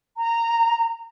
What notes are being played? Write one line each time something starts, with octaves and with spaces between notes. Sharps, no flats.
A#5